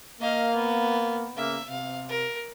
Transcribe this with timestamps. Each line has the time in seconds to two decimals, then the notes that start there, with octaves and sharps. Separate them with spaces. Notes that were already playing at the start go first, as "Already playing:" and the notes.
0.21 A#3 D#5 F5
0.55 B3
1.36 C#3 A#3 E5
1.69 C3 F5
2.09 A#4